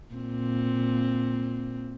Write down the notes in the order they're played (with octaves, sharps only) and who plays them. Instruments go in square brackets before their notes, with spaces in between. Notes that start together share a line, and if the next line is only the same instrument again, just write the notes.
[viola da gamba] A#2 C4